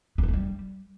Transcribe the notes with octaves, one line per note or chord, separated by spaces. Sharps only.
B3
D4
A3
G3